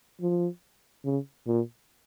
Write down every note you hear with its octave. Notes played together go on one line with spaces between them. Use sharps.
F3
C#3
A#2